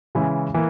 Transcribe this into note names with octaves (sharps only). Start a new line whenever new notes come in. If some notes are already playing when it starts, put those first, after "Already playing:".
C#3 E3 G#3 C#4 E4
E3 A#3